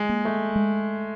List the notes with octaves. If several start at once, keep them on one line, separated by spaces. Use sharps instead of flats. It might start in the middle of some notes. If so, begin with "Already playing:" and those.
Already playing: G#3
A#3
A3
G#3